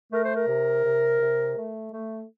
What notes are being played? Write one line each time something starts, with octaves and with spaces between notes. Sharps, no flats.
A3 A#4
C5
A#4
C3
C3
C3
A3
A3